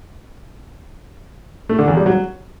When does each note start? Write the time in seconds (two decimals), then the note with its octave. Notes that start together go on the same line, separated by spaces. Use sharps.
1.69 A3
1.79 D3
1.88 E2
1.97 G3
2.06 F#3